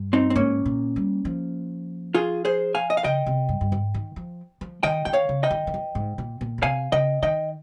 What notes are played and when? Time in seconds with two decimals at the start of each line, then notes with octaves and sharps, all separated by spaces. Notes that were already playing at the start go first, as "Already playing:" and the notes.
Already playing: G2
0.13 C4 D#4
0.30 C4
0.35 G#2 A#3 C#4
0.66 A#2
0.96 G3
1.25 F3
2.14 F4 G#4
2.45 G#4 C5
2.75 F5 G#5
2.90 D#5
2.97 F5
3.04 C#3 D#5 G5
3.26 C3
3.49 G2
3.61 G2
3.72 G#2
3.94 D#3
4.16 F3
4.61 F3
4.83 D#3 D#5 G5
5.05 D#3 G5
5.13 C#5 F5
5.29 C#3
5.43 D#5 G5
5.51 D#3
5.67 D#3
5.74 F3
5.95 G#2
6.18 A#2
6.41 A#2
6.58 C#3
6.62 C3 F5 G#5
6.92 C#3 D#5 G5
7.22 D#3 D#5 G5